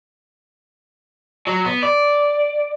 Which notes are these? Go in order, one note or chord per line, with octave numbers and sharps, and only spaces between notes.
F#3
B3
D5